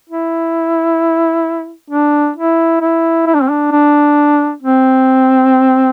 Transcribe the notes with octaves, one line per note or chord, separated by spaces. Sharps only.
E4
D4
E4
E4
E4
D4
C4
D4
D4
C4